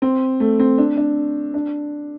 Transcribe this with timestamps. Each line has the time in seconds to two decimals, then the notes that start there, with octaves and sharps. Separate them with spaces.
0.02 C4
0.40 A3
0.59 C4
0.78 D4
0.97 D4
1.54 D4